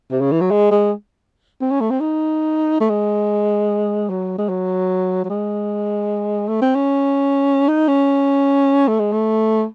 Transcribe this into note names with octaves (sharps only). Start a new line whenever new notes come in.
C3
C#3
E3
F#3
G#3
G#3
C4
C#4
A3
C4
D#4
A3
G#3
F#3
G#3
F#3
F#3
G#3
A3
C4
C#4
D#4
C#4
A3
G#3
A3